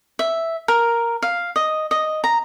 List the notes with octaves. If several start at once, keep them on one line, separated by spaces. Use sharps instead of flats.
E5
A#4
F5
D#5
D#5
A#5